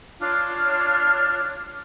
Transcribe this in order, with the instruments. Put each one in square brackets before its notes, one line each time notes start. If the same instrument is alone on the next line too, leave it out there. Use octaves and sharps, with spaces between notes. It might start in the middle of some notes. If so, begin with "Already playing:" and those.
[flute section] D4 F4 C#5 F6